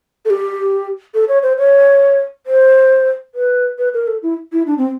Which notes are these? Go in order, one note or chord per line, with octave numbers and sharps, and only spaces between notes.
A4
G4
A4
C#5
C5
C#5
C5
B4
B4
A#4
A4
E4
E4
D4
C4